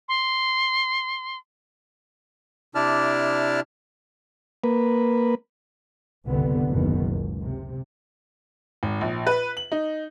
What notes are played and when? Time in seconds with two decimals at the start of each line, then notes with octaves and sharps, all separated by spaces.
0.08 C6
2.75 C3 D4 E4 D5 A5 F6
4.64 A#3 B4
6.26 F#1 C2 G2 D3 B3
6.70 F#1 D#2 B2 D#3 B3
7.01 C#2
7.41 C3
8.83 G#1
9.01 A#1
9.27 B4
9.57 F#7
9.72 D#4